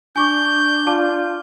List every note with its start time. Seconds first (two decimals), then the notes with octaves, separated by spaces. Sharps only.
0.16 D4 G#5 C#6 D6 G6
0.87 F4 D5 A5 D6